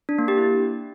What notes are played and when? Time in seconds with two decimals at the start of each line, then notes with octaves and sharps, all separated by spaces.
0.09 D4
0.18 A#3
0.28 G4
0.38 E4